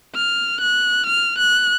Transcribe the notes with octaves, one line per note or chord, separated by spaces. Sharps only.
F6
F#6
F6
F#6